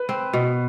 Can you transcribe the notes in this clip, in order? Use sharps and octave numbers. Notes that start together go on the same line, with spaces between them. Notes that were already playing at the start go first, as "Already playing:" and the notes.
Already playing: B4
C4
B2